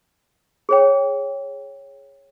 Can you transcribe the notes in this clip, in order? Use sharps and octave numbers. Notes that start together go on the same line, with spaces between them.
G#4 C#5 G5